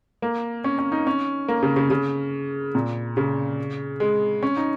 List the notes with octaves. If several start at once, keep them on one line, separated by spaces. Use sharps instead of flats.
A#3
C#4
C#4
D#4
C#4
A#3
C#3
C#3
C#3
A#2
C#3
G#3
C#4
D#4